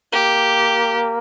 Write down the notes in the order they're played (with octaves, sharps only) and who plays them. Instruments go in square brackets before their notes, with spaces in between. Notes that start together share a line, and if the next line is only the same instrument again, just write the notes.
[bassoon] A#3 [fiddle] G4